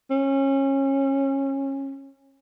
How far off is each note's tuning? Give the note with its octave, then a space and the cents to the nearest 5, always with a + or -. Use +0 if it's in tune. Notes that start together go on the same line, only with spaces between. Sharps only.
C#4 -25